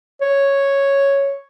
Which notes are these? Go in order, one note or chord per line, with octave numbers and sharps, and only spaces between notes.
C#5